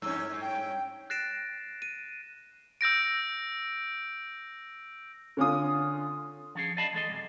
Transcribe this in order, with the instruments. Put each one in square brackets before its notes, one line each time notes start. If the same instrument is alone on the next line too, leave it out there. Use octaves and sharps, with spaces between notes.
[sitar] G2 C#4 [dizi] E6
[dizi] G5
[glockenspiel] F#6 A6 A#6 C7 D7 E7
D#7
[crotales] E6 G6 A#6 D7
[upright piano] D3 C#4 F4 D#6
[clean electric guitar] F3 C#4 G#4
D5 D#5 F5 A5 B5
E3 G#3 A4 D#5
F#2 C3